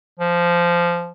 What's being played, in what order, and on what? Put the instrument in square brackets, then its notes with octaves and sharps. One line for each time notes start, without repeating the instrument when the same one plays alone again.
[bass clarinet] F3